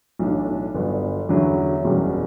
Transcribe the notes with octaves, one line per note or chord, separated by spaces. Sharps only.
B1 A2 E3 A3 D4
G1 G2 F#3 B3
E2 D3 F#3 C#4 E4
F#1 E2 B2 G3 C#4